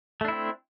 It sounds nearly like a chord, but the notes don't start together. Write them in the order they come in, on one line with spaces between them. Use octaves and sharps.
A3 D4 E4 C4